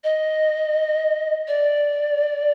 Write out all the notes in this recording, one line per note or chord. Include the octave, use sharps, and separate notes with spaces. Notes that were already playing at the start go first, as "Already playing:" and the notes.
D#5
D5